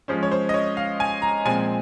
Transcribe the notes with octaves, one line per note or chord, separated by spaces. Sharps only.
F3 G#3 C#4 C5
C#5
C5
D#5
C#5
F5
G#5
A#5
A#2 F3 G#3 C4 G#5